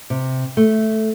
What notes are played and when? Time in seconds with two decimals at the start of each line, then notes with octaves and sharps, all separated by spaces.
0.10 C3
0.57 A3